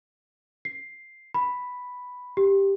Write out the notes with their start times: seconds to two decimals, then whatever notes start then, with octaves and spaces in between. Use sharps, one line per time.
0.65 C7
1.34 B5
2.37 G4